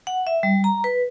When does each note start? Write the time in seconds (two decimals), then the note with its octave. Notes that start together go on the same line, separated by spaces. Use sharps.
0.07 F#5
0.27 E5
0.43 G3
0.64 A#5
0.84 B4